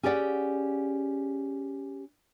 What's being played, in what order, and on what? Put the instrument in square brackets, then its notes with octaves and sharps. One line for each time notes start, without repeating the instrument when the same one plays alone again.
[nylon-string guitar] C#4 G4 G#4 D5 F#5